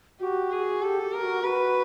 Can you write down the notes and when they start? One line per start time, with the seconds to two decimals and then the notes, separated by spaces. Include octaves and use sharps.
0.20 F#4 G4
0.51 G#4
0.82 G4 A4
1.03 G4
1.13 A#4
1.23 F#4
1.43 F#4 B4